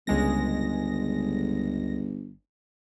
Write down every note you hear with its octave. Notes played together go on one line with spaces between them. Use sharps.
G1 C#2 G#3 A#6